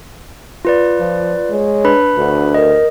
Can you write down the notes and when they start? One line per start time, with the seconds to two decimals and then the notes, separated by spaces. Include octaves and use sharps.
0.65 F4 B4 D5
0.99 F3
1.50 G#3 C#5
1.85 D4 B4 B5
2.18 D2 F#4
2.54 A#4 D#5